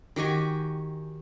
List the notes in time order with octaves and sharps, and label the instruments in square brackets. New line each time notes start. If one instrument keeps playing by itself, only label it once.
[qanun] D#3 F#4 G4 G#5